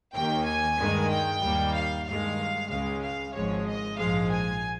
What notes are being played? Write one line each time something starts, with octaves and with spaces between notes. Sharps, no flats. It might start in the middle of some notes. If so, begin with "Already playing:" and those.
D#2 D#3 A#3 G5
G#5
G2 D#3 G#3
G5
D#2 D#3 G3 A#3
F5
G2 D#3 G#3 F5
C#2 C#3 G#3 F5
F5
G#1 G#2 F3 G#3 C#5
D#5
A#1 G#2 F3 G#3 F5
G#5